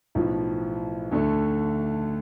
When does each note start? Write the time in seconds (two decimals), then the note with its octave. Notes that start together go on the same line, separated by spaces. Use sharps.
0.15 B1 A2 F3
1.12 D2 D3 A3